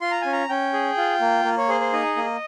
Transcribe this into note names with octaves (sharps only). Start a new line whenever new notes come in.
F4 C6
A#5
C#4 G#5
A#5
C#4 G5
G#4
F4
A#3
A#3
C#5
G#4 C5
C5
D#4 D#5
A#3